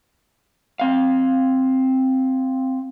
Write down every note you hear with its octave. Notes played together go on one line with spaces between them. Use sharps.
C4 F5